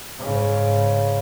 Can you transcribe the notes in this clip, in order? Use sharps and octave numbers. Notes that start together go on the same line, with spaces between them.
G#2 C#3